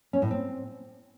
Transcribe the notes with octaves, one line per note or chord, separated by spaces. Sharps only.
C#4
A2
C4